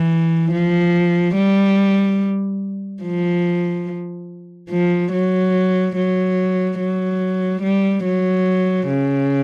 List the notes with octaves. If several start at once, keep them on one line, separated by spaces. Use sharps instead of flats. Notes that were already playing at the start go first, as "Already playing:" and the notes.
Already playing: E3
F3
G3
F3
F3
F#3
F#3
F#3
G3
F#3
C#3